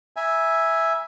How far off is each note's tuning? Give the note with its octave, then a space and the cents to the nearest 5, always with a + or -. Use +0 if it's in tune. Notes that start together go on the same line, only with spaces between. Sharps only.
E5 +0 G#5 +0 B5 -45